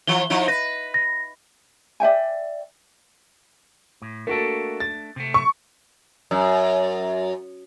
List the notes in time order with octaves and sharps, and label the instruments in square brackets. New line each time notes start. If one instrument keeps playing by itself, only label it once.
[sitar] E3 F3 [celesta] G7
[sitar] F3 D#4 E4
[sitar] B4 [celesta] A#6
[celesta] A#6
[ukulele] D5 E5 G5 G#5
[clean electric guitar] A2
[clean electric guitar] A3 D4 [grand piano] A#3 F#4 A4
[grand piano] A6
[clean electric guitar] C3 A3
[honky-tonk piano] C#6
[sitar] F#2